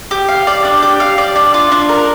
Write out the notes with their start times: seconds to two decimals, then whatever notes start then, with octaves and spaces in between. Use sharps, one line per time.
0.11 G4
0.28 F5
0.47 D5
0.65 D4
0.82 G4
1.00 F5
1.18 D5
1.36 D4
1.54 F4
1.72 D4
1.89 A#4